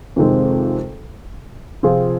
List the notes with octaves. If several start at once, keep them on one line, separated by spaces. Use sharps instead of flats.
F2 C3 D#3 G#3 C4
C3 F3 C4 F4 G#4